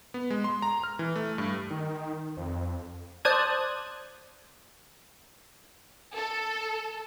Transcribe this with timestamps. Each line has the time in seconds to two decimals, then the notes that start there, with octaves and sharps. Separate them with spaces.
0.14 B3
0.30 G#3
0.44 C6
0.62 A#5
0.84 F6
0.99 E3
1.16 A3
1.38 G2
1.70 D#3
2.37 F2
3.25 C5 D5 A5 D#6 F#6 G#6
6.15 A4